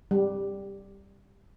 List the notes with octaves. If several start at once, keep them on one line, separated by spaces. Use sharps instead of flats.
G3